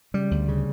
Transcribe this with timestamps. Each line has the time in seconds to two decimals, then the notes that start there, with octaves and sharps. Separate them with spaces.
0.14 C#3 G3
0.31 D2
0.48 C#3